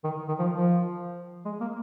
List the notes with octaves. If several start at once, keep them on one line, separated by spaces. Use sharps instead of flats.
D#3
D#3
F3
F3
G#3
A#3